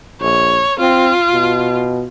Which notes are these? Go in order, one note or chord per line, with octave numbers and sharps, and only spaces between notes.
A#1 C#5
C4 F4
B2